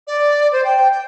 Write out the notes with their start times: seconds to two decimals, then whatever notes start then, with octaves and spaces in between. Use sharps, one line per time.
0.07 D5
0.52 C5
0.64 G5
0.92 G5